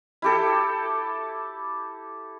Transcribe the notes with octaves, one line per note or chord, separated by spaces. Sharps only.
E4 G4 A4